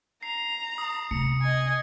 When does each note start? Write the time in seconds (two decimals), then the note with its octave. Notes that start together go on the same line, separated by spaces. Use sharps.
0.23 A#5 C7
0.78 D#6
1.11 C3 C#7
1.42 D#5 G#5